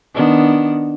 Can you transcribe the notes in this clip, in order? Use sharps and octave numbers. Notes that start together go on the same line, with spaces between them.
D#3 B3 D4